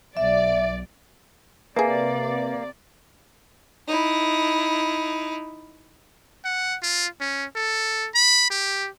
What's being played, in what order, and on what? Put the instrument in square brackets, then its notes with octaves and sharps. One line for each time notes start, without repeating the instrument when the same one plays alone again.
[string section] B1 D5 [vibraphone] E5
[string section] C3 D5 [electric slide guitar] A#3 [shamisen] G#4 A4 [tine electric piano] B4 E5
[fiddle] D#4 E4
[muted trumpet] F#5
F4
C#4
A4
B5
G4